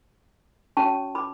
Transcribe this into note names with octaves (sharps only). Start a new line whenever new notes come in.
C#4 F#4 C#5 A5 C#6
B5 D6